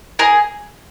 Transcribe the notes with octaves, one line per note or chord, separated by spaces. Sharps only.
G#4 A#4